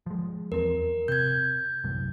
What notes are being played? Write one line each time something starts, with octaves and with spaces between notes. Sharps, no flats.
F3 G#3
E2 F3 C4 A#4
C3 G6 G#6
C2 F#2 A2